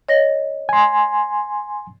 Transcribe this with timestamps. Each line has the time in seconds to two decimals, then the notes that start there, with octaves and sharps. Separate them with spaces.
0.09 C#5 D#5 A#6
0.69 G#5 C6